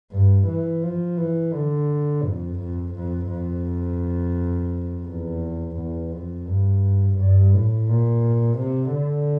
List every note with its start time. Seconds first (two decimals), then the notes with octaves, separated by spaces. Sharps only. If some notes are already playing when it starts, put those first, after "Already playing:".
0.12 G2
0.47 E3
0.83 F3
1.18 E3
1.53 D3
2.24 F2
2.59 F2
2.95 F2
3.29 F2
5.06 E2
5.77 E2
6.12 F2
6.48 G2
7.18 G2
7.53 A2
7.89 A#2
8.59 C3
8.94 D3